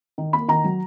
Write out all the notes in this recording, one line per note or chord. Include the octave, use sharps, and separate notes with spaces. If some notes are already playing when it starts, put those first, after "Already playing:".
D#3
A#3 B5
D#3 A#5
F#3